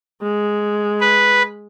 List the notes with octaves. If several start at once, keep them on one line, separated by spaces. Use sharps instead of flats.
G#3
B4